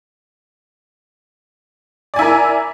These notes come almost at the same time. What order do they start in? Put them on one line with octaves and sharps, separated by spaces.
D5 G#5 E4 A#4